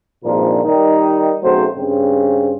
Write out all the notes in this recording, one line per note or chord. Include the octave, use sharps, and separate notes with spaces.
G#1 G2 A#2 F3 D4 A#4
D#3 G3 D#4
B1 C#3 F#3 A3 C4 C5
G2 C#3 C4